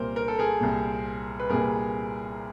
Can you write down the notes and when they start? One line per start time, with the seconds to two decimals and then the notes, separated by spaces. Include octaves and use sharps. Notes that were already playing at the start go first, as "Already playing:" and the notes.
Already playing: C2 A#2 A#4 C5
0.16 A#4
0.28 A4
0.39 G#4 A#4
0.61 C2 A#2
1.40 B4
1.49 C2 A#2 G#4 A#4